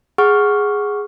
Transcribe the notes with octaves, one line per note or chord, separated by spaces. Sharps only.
G#4 F#5 C#6 F6